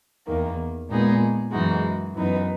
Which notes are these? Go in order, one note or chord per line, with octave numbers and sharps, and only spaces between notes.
E2 D#3 A#3
A#2 G#3 B3 D#4 G#4
F#2 E3 G#3 D#4 F#4
F#2 E3 B3 D#4